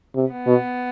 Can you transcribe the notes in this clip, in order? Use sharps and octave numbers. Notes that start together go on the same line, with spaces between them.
C3
B3
B2